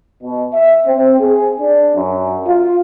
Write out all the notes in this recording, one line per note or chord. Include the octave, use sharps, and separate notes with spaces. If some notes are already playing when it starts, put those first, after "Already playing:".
B2
E5
C4
G#4
D4
F#2
F4